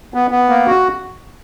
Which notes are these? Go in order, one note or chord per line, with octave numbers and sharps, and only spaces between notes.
B3
B3
A#3
F#4